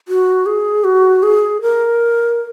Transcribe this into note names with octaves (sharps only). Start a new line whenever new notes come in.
F#4
G#4
F#4
G#4
A#4